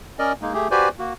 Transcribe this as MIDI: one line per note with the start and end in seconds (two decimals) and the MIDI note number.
0.19 0.33 61
0.19 0.33 70
0.19 0.33 74
0.19 0.33 75
0.42 0.53 56
0.42 0.53 58
0.42 0.53 63
0.53 0.68 57
0.53 0.68 67
0.53 0.68 68
0.71 0.89 66
0.71 0.89 67
0.71 0.89 71
0.71 0.89 72
0.71 0.89 74
0.71 0.89 80
0.99 1.13 58
0.99 1.13 66